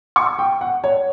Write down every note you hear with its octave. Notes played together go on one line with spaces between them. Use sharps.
C#6
G5
F#5
C#5